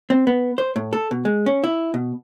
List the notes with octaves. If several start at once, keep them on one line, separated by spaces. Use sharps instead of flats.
C4
B3
C5
A2
A4
B2
G#3
C#4
E4
B2